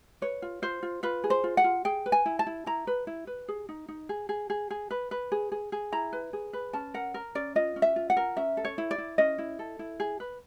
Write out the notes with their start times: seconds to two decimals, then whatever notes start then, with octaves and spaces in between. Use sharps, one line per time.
0.22 B4 C#5
0.42 F4
0.62 F4 C5
0.83 F4
1.03 F4 B4
1.24 G#4
1.30 C5
1.44 F4
1.57 F#5
1.64 F4
1.85 G#4 G5
2.06 B4
2.12 G#5
2.26 E4
2.39 A5
2.47 E4
2.66 E4 A#5
2.87 B4
3.07 E4
3.27 B4
3.48 G#4
3.69 D#4
3.88 D#4
4.09 G#4
4.29 G#4
4.50 G#4
4.71 G#4
4.91 B4
5.11 B4
5.32 G#4
5.52 G#4
5.72 G#4
5.92 E4 A#5
6.13 B4
6.33 G#4
6.53 B4
6.73 C#4 A5
6.94 A#4 F#5
7.14 A#4
7.35 C#4 D5
7.55 F4 D#5
7.76 C#4
7.82 E5
7.96 F4
8.10 F#5
8.17 A#4
8.37 C#4 E5
8.57 A4
8.65 C#5
8.78 E4
8.91 D5
8.98 E4
9.18 C#4 D#5
9.38 E4
9.59 A4
9.79 E4
10.00 G#4
10.20 B4